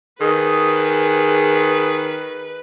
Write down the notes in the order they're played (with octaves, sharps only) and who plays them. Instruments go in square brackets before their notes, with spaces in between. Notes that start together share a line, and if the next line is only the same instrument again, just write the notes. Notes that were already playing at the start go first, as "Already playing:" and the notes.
[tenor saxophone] D#3 [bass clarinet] G#4 [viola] B4